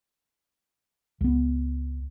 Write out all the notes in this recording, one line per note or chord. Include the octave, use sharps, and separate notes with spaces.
C#2 B3